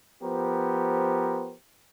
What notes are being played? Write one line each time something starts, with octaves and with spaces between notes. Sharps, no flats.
F3 B3 G4 A#4 C5